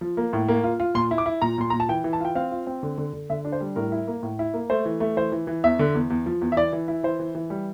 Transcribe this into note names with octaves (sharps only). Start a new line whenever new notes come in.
F3
A#3
A2
A#3
F4
F4
A#2 C6
E4
D6
E4
A#2 A#5
A#2 C6
A#2 A#5
A5
E3 G5
E3
A5
F4 G5
C4 F5
F4
C4
D3
D3
D3
D3 E5
D4
C5
G3
A2 A#4
E4
A#3
A2
E4
A#3
A3 C5
E3
A3
E3 C5
E3
E3
E2 E5
D3
E2
E2
F3
E2
E5
E3 D5
E3
E4
E3 C5
E3
E3
G3